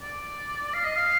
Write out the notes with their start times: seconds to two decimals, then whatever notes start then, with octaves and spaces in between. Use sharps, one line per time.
0.02 D5
0.74 F5
0.84 D#5
0.96 F5